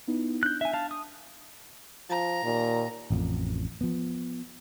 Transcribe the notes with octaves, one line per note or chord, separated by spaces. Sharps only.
B3 D#4 E4
D4 F#6 G6
E5 G#5
F5 A5
D#6
F3 A#5
D#2 A#2
A1 F2
F3 B3